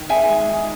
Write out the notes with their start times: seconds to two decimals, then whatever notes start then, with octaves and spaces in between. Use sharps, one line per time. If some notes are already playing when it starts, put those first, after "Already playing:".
Already playing: D#3
0.10 G#4 E5 G#5
0.29 G#3
0.49 D#4